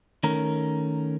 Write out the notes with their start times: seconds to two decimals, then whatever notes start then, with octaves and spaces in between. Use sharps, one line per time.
0.23 D#3 A3 C#4 A#4